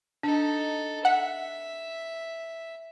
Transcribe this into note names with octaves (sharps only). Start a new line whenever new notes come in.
D4 D#4 A4
E5 F#5